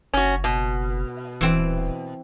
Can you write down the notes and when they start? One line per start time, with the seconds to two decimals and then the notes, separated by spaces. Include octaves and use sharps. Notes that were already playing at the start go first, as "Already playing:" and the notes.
0.13 F#1 C#4 F#4
0.44 B2
1.41 D#1 E3 C4